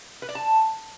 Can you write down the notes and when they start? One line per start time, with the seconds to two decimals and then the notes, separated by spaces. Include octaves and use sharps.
0.22 B4
0.29 D5
0.35 A5